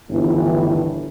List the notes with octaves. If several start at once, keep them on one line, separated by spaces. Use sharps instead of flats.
G1 D2 A2 D#3 E3